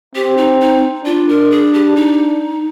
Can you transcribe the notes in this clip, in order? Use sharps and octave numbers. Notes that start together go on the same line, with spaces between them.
C4 G4
D#4
D#4
D4 F4
A#4
G#4
G4
D#4